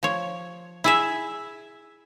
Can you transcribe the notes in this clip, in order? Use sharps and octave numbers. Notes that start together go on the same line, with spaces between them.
F3 C#5
E4 G#4 E5